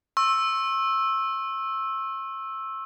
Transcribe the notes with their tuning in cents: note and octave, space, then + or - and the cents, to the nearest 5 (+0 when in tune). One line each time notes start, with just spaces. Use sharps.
C#6 -45 E6 +0